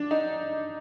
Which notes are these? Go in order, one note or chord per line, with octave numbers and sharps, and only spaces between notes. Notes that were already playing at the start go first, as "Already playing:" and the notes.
Already playing: D4
D#4